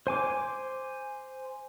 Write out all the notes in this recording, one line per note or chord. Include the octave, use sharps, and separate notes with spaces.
C5 G#5 D6